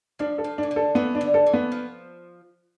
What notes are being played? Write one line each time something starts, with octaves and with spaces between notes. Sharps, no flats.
F3 D4
A4
F3
E3 D4
D3
A4
E3 B3
D4
D3
A4
E3
B3
F3